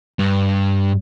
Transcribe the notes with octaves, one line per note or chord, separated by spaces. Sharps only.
G2